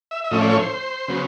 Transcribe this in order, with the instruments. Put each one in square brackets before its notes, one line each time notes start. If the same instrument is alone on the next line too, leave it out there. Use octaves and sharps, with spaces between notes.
[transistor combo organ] E5
E5
A2 F3 A3 C#4 D#5
D5
C#5
C5
C#3 F#3 B3